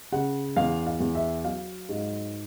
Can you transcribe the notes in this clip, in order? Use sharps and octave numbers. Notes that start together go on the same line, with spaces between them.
C#3 F#5
E2 F5
F5
E2
E5
F#3 F5
G#2